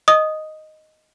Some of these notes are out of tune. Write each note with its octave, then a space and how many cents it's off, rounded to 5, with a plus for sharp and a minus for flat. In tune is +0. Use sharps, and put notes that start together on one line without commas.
D#5 +0 D#6 +0